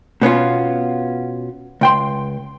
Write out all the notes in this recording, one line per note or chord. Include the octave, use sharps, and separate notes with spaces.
B2 B3 C#4 F4
C#2 G5 C6